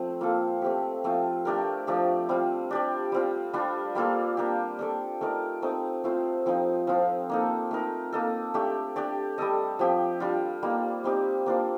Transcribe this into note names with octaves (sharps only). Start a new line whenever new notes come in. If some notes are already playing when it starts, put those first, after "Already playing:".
Already playing: F3 A3 C4
A#3 F4 A4
A3 C4 G4
F3 A3 C4
A3 D4 G4 A#4
F3 A3 D4 G4
G3 C4 F4
D4 G4 D5
G3 C4 F4
G3 D4 F4
G3 A#3 F4 A4
A#3 D4 G4
D4 A4 D5
A3 D#4 A#4 D5
A3 C4 D#4
A3 C4 F4 C5
F3 C4 D#4
F3 C4 F4
A#3 D#4 A4
A3 D#4 A#4
A#3 D#4 A4
A3 D4 G4
D4 G4 D5
G3 D4 A4 D#5
F3 C4 G4
G3 D4 F4
G3 A#3 D#4
G3 C4 D#4 G4
A#3 D4 F4 C5